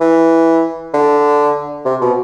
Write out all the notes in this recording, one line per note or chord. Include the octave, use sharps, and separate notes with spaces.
E3
D3
C3
B2